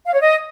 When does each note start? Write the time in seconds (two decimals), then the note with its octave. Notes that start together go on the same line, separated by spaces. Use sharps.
0.05 F5
0.13 C#5
0.21 D#5